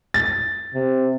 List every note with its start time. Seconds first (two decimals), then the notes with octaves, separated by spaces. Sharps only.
0.14 A6
0.74 C3